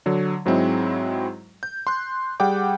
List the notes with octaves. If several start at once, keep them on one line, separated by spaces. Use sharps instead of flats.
D3 F#3
G#2 F#3 G#3 C4 E4
G6
C6 F#6
G3 G#4 F#5 G5 D6